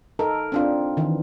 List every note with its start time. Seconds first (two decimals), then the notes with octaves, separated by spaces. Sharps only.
0.19 D#4 A4 A#4
0.52 C4 D4 F4
0.97 D#3 E3